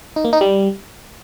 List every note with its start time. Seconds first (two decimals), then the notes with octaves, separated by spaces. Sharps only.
0.16 D#4
0.25 A#3
0.33 D#4
0.41 G3